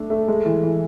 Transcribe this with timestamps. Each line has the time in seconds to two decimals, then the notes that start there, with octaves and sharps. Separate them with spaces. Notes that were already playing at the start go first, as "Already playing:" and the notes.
Already playing: A3 D4 A4
0.10 A3
0.28 G#3
0.46 E3
0.63 E3